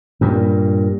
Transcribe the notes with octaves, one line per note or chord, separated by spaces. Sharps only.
G2 A#2